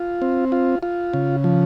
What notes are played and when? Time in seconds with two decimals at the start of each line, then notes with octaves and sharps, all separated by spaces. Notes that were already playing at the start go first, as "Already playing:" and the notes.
Already playing: F4
0.22 C4
0.52 F4
0.83 F4
1.14 C#3
1.44 F3